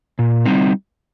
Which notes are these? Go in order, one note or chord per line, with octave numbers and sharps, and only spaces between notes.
A#2
G3 C4 D#4